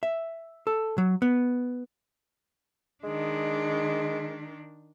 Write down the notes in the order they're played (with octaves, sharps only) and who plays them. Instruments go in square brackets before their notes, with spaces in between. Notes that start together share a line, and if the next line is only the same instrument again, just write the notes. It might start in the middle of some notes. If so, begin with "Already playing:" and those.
[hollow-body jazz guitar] E5
A4
F#3
B3
[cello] D#3 D4 [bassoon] G#3